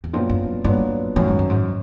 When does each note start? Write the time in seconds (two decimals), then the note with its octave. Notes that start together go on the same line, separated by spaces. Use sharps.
0.04 E2
0.13 F2 A#2 F#3 B3 D4 F4
0.29 F#2
0.64 G2 A#2 F#3 B3 D4 F4
1.16 F#2 A2 D#3 F#3
1.27 G#2
1.39 G2
1.50 G#2